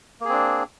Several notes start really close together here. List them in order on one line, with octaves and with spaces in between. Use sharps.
A#3 G#4 C4 D4